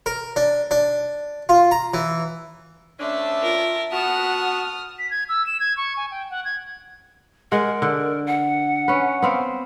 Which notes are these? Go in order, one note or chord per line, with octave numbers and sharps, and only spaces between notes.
A#4
D4
D4
F4
A#5
E3
D2 C#4 D4 E5 A5
F4 A#4
B3 F#4 F#5 A5 D#6 F6
B6
G#6
E6
E7
G#6
C#6
G#5
G5
F#5
G#6
G#3 A#4 F#5
D3
F#5
C#4 B4
B3 C4 F5